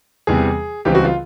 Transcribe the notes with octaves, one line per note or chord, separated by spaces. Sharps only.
E2 C3 E3 G3 G#4
C#2 C#3 E3 G3 C4 G4
F#4
F4